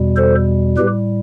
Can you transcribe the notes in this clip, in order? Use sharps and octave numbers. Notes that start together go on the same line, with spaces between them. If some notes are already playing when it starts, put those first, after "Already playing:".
Already playing: E2 B2 G3
A4 C5
A2 G3 G4 B4